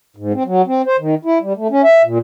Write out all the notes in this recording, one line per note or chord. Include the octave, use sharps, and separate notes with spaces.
G#2
C4
F#3
C4
C5
D#3
E4
G3
A3
C#4
E5
A#2